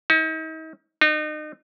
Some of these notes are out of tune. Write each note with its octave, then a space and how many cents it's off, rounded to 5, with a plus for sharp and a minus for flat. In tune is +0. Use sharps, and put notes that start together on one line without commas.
D#4 +40
D#4 -35